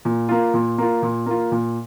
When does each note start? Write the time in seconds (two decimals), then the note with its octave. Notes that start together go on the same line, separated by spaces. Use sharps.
0.05 A#2
0.29 A#3 F4
0.54 A#2
0.78 A#3 F4
1.02 A#2
1.26 A#3 F4
1.52 A#2